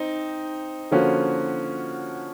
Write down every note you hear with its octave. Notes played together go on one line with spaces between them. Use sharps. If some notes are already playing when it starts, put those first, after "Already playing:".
Already playing: C4 D#4
D3 F3 A#3 C#4 F#4